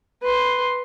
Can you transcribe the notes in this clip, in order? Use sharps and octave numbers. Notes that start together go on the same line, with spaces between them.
B4 C6